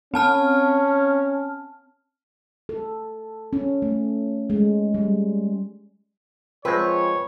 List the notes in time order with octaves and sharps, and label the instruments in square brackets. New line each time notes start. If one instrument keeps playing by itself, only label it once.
[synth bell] C4 A5 F6 [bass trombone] C#4
[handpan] A4
C#4
A3
G#3
G3
[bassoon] F3 [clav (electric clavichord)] G#3 C4 [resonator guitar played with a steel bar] B4 [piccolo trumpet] C#5